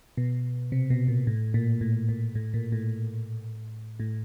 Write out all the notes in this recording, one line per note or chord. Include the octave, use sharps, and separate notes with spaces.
B2
C3
B2
A#2
A2
A#2
A2
A#2
A2
A#2
A2
A2